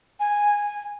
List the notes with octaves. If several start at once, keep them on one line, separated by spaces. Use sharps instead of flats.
G#5